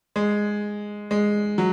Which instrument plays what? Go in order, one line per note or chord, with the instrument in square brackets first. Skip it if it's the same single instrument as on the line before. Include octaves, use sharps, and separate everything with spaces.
[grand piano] G#3
G#3
F#3